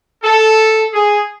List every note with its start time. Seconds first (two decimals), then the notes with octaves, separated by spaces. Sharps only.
0.23 A4
0.93 G#4